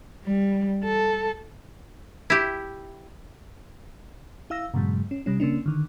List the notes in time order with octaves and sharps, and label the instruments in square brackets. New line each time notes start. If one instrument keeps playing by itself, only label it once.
[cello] G3
A4
[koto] E4 G4
[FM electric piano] E4 F5 E6 A#6
G2 A#2 C#3 F#3 G#3
C#4
C3 G3 C#4
C#3 A#3 C#4 D4
D3 D#3